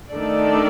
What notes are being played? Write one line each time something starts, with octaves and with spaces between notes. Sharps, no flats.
D#3 A3 D4 A4 D5